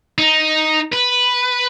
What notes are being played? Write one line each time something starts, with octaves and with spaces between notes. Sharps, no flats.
D#4
B4